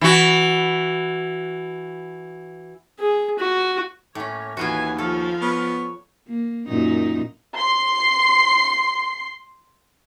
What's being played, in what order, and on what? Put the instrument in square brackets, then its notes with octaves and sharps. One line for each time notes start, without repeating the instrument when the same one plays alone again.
[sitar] E3 F#4
[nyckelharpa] G#4
F#4
[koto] A2 C#4 [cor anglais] A#3 [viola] C#5
[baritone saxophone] D#2 [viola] E3 G#5 [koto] B3 F4 F#4 [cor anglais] B4
[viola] F3 F5 [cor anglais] C#4 [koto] A4
[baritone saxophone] B3 [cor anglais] C#5
[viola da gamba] A#3
F#2 A#2 D#4
[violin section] C6 C7